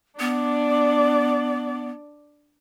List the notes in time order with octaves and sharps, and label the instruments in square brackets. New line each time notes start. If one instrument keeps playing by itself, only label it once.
[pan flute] B3 [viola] D4 D5